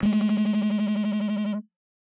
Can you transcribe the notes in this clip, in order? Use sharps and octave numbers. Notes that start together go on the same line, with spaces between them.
G#3 A3